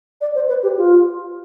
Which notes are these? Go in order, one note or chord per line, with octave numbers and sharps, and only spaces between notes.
D5
C5
B4
G4
F4